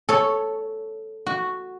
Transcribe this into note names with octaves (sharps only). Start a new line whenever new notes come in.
A4 C#5
F#4